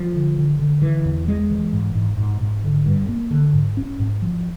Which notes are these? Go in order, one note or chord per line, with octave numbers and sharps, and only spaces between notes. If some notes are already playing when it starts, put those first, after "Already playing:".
Already playing: F3
D3
D3
D3
E3
E2
G#3
E3
G#2
G#2
G#2
G#2
D3
G2
A#3
D3
G#2
C#4
G#2
F3